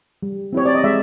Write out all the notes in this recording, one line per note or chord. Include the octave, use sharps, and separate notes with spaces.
G3
C4 E4 G4 C#5
D5
D#5
G#3 E5